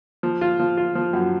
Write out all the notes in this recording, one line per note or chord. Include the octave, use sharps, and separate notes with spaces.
F3
F4
F3
F4
F3
F#2